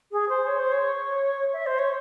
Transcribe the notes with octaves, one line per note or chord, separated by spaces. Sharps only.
G#4
C5
C#5
C5
C#5
E5
C5
C#5